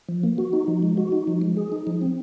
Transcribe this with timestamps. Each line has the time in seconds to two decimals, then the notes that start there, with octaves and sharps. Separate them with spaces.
0.09 F3
0.23 A#3
0.38 F#4
0.53 D#4
0.68 F3
0.83 G#3
0.97 F#4
1.12 D#4
1.28 F3
1.42 G#3
1.57 G#4
1.72 D#4
1.87 F3
2.02 C4